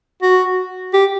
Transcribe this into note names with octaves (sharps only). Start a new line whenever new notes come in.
F#4
G4